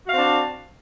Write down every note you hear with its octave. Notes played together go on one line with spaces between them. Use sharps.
C4 D4 F#4 F5